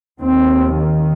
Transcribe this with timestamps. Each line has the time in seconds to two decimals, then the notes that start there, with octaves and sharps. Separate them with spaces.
0.20 D#2 C4
0.76 D#3